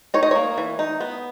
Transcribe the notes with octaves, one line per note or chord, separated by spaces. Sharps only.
D#4 C#5
D#5
A#3 C#5
E3
D#4
B3